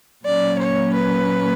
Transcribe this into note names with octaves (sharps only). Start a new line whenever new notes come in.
A#2 F#3 A#3 C#4 D5
C#5
B4